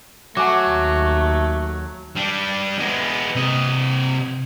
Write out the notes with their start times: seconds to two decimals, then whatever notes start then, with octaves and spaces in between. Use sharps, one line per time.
0.37 F#3 A3 F#5 G#5 D6
0.69 D#2
2.16 G3 D4
2.79 G#3 B3
3.35 C3 D#5